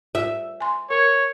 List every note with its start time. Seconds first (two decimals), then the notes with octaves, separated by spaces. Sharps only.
0.15 F4 E5
0.60 G#5 C6
0.90 A#4 C#5